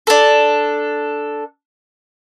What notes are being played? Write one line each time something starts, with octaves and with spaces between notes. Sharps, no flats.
D4 A4